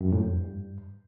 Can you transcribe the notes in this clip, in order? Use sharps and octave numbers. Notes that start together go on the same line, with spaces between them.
F#2
A2
F2
G2